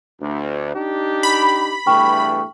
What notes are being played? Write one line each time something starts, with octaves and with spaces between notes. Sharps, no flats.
D2
D4 D#4 G4
B5
E2 G2 A3 G5 C#6 F6